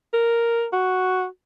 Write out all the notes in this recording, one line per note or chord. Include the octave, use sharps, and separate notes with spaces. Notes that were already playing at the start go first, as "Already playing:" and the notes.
A#4
F#4